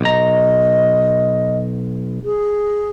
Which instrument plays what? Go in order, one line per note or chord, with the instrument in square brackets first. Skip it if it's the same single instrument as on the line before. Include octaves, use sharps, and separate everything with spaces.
[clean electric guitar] B1 A#5 [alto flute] D#5
[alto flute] G#4